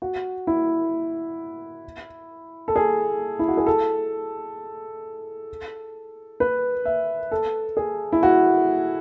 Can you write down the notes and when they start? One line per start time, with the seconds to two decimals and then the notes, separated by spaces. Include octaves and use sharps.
0.02 F#4
0.47 E4
2.68 A4
2.76 G#4
3.39 E4
3.48 F#4
3.57 G#4
3.67 A4
6.40 B4
6.86 E5
7.31 A4
7.77 G#4
8.12 E4
8.23 F#4